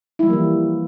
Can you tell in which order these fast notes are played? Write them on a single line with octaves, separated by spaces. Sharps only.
E4 G3 F3 A#3 E3